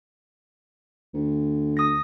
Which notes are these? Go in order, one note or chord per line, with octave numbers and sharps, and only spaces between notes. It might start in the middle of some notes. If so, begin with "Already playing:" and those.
D2
D#6 A#6